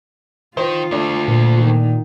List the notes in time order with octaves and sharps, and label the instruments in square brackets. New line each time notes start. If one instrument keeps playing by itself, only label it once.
[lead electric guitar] D#3 [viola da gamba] F4 [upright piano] C5
[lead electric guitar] D2 [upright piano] A3 D4
[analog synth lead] A#2
[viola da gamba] D#3